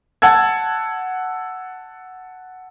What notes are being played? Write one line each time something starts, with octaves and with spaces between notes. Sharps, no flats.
F#5 A5 E6 G#6